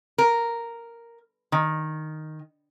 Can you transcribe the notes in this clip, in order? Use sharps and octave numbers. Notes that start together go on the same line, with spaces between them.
A#4
D#3